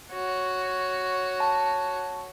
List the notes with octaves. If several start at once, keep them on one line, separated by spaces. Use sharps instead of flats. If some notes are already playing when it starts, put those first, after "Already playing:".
F#4 C#5
A5